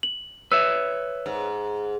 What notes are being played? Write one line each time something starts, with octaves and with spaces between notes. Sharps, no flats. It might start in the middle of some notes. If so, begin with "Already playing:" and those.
F#7
B4 C#5 E5 E6
G#2